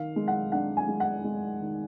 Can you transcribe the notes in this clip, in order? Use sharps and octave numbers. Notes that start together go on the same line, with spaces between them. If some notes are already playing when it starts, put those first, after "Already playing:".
Already playing: D#3 F5
G#3
F#5
D4 F#5
G#5
G#3
F#5
G#3
D#3